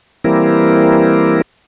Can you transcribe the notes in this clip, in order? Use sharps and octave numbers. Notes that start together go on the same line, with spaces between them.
E3 G3 A#3 C4 E4 A#4